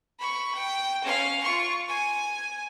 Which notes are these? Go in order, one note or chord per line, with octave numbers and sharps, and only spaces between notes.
B5 C#6
G5
C#4 F5
F4 C#6
G#5